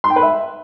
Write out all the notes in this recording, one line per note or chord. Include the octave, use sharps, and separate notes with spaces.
C6
G5
B4
E5